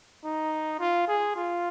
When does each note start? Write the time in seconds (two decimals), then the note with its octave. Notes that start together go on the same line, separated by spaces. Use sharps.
0.24 D#4
0.79 F4
1.08 G#4
1.36 F4